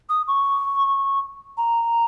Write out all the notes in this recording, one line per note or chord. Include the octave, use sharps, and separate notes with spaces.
D#6
C#6
A#5